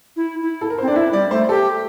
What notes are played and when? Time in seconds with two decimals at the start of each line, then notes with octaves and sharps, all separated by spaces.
0.16 E4
0.42 E4
0.61 A4
0.70 A#4
0.78 C5
0.82 C4
0.88 D4 D5
0.96 E4 E5
1.13 G3 D5
1.31 A3 C5
1.49 G4 A4